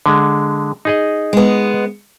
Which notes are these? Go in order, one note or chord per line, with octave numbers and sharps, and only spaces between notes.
D3 G#3
D#4 G#4 D#5
G#3 B3